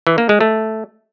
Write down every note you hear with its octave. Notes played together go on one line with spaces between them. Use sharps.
E3
A#3
G#3
A3